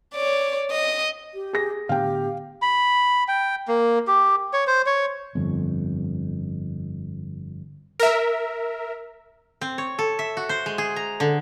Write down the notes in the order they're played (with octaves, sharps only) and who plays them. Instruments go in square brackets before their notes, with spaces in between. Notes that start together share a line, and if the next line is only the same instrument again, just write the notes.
[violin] C#5 D5
D#5
[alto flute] G4
[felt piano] G#4 A#6
[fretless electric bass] A2 D3 B3 [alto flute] G4 [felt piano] F5 G5
[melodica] B5
G5
A#3
G4
C#5
C5
C#5
[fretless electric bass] G1 F2
[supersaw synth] A#4 E5
[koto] C4
C#5
A4
E5
F#4
C5
G#3
G#4
A#5
D3